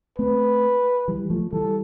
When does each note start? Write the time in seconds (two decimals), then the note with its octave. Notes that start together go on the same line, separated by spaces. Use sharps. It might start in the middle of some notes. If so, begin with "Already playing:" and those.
0.18 A3 C4 B4
1.08 E3 G3
1.30 F3 A3
1.53 E3 G3 A4